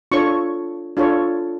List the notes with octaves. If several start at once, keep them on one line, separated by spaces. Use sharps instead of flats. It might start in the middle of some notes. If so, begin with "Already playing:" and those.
D4 F4 A4 C#5 C#6
D4 F4 A4 C#5